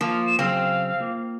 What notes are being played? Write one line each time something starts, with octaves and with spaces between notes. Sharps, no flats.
F3 A#3 A#4 F5
E7
C#3 F#3 C4 G#4 F5
A#3 F4